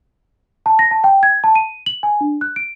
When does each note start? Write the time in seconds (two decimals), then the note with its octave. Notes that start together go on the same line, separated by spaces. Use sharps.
0.66 A5
0.79 A#6
0.91 A5
1.04 G5
1.23 G#6
1.44 A5
1.55 D#7
1.86 F#7
2.03 G#5
2.21 D4
2.41 F#6
2.56 D7